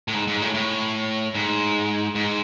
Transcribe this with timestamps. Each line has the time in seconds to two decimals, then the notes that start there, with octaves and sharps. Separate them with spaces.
0.08 A2
0.14 G#2
0.27 G#2
0.42 A2
0.54 A2
1.35 G#2
2.15 G#2